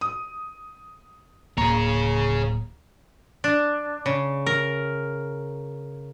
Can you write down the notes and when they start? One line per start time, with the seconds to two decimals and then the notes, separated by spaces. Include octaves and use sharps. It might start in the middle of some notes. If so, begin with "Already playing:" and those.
0.01 D#6
1.58 D1 A#3 G#4 C#5 A#5
3.44 D4
4.06 C#3
4.46 A#4